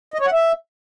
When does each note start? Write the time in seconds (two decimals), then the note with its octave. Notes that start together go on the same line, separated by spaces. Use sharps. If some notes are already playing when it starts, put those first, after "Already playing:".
0.14 D#5
0.20 C#5
0.26 F#5
0.32 E5